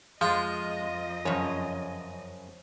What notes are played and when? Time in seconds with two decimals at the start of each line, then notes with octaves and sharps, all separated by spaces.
0.21 F2 F3 G#3 F4 D#5
1.25 F#2 C#3 F3 C#5